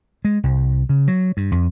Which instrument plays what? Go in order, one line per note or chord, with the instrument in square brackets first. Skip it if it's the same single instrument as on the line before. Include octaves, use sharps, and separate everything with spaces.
[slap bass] G#3
C2
C#3
F#3
G2
F2